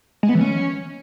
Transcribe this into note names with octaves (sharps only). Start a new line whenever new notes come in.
G#3
B3
E3
C#4